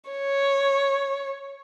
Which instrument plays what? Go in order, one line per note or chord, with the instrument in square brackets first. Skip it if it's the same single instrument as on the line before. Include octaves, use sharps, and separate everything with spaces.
[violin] C#5